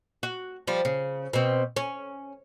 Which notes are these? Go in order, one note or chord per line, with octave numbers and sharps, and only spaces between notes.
F#4
F3 G3
C#3
B2 C4
C#4